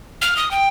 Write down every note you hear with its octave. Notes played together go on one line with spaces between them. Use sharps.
F6
D#6
G5